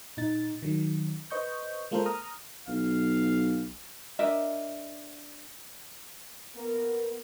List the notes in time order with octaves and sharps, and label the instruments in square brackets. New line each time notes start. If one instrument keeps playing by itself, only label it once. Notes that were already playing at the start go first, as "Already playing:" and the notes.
[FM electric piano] A#2 D#4 A6
D#3 F#3
B4 C5 D#5 C#6 G6
G#3 A#3 F4 A4 A#4 C5
A#5 D#6 F6
[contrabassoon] B1 [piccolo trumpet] F5
[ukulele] D4 A#4 D#5 E5
[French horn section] A#3 B3 A#4